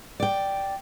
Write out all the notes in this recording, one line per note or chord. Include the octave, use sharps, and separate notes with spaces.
D5 G5